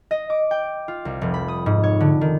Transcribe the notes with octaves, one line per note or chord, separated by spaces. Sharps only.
D#5
D6
G5
F4
C2
F1
B5
D#6
G#2
C#5
D3
D#3